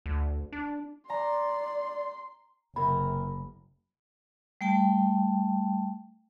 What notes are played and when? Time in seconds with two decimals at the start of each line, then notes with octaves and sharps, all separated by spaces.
0.06 D2
0.52 D4
1.10 D5 A#5 C6
2.76 F#1 C3 A#4 B5
4.61 G3 A3 G5 A5